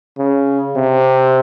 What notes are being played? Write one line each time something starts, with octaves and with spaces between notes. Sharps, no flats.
C#3
C3